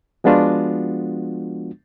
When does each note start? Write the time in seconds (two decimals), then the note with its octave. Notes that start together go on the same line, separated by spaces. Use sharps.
0.24 F3 G#3 B3 D4 F4 F#4